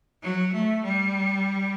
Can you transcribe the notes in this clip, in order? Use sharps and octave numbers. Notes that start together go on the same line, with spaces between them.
F#3
A3
G3